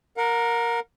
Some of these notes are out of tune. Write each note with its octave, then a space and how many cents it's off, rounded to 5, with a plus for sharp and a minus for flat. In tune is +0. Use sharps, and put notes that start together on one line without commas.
A#4 +0 F#5 -40